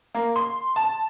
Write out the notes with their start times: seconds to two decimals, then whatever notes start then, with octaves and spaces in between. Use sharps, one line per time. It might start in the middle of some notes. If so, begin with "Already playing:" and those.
0.15 A#3
0.36 C6
0.76 A5